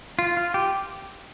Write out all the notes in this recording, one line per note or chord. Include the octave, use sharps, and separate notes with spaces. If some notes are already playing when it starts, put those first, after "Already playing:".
F4
F4
G4